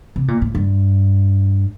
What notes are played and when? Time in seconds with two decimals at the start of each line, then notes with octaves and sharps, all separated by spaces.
0.16 C3
0.28 A#2
0.42 A2
0.55 G2